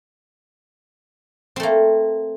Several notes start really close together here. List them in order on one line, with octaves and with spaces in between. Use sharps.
C4 A3 A#3